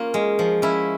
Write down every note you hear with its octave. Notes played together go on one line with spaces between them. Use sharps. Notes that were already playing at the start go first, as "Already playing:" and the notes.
Already playing: A#3 C#4 F4
G#3
F3
C#4 E4